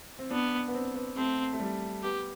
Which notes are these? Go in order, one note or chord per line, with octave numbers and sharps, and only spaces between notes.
C4
B3 D4
B3
C4
B3
A3 C4
A3
G3
B3 G4